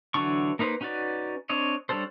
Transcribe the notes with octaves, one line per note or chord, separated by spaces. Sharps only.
D3 E3 F#3 D4 C#6
A#3 D#4 B4 C5
C#4 D#4 F#4 B4 D5
C4 D4 C#5 D#5
G3 C#4 D4 A4 C5